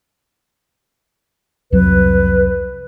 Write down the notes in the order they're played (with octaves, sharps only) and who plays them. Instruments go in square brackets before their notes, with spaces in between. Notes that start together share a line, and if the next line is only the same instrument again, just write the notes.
[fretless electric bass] C2 F2 F#3 [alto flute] B4